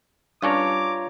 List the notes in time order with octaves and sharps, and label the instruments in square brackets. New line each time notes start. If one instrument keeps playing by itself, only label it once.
[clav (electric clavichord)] G2 C#4 D4 [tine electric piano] F4 C#5 A#5 [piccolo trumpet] D6